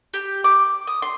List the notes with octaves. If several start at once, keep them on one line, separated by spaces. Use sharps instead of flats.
G4
D6
D#6
C6